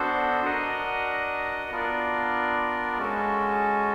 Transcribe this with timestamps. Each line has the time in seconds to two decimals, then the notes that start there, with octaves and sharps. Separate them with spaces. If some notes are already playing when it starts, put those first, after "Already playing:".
Already playing: B3 D4 F#4 A4 C5
0.43 D4 F#4 A#4 D#5 F#5
1.71 B3 D4 F4 A#4 D5
2.98 G#3 C#4 F#4 A4